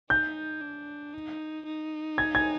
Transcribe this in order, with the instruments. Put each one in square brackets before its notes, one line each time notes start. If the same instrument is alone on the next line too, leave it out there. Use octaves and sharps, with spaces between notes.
[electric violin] D#4 [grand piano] G6
[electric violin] D4
D#4
D#4
[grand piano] G#6
G#6